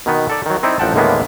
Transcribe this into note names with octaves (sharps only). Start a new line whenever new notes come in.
B2 D#3 B3
A4 D5
D#3 F#3
C4 D#4 E4 D5
A1 F3 F#5 G5 A5
D#2 A2 D3 G#3 A#3 B3